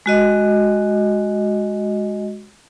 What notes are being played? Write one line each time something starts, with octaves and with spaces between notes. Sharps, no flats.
G#3 F#4 D#5